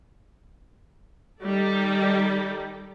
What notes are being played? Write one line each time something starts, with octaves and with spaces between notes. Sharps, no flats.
D#3 G3 D#4 A4 D5